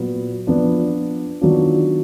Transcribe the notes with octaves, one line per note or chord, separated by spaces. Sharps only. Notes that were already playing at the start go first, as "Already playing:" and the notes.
Already playing: A#2 F#3 B3 F4
F3 B3 D4 F4
D#3 F#3 B3 D4 F4